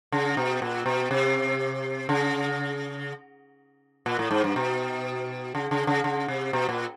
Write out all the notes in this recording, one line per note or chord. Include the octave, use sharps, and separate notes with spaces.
C#3
B2
A#2
B2
C3
C#3
A#2
A2
G#2
G2
B2
C#3
C#3
C#3
C#3
C3
B2
A#2